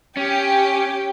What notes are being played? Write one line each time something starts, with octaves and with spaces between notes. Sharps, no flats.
C#4 G4 G5